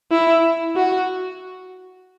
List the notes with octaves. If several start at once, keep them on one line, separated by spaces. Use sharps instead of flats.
E4
F#4